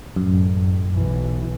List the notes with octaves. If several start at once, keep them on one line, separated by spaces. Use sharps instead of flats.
A1 F#2 A2
B1 E3